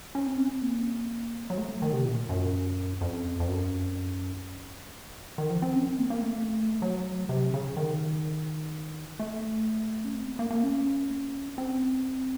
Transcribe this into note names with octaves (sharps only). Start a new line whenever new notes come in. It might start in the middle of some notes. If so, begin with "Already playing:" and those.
C#4
C4
C#4
C4
A#3
F#3
A3
D#3
C3
A#2
F#2
F2
F2
F#2
D#3
F3
C4
C#4
C4
A#3
A#3
A3
F#3
C3
C#3
D#3
A3
C#4
C4
A3
A#3
A#3
C#4
C4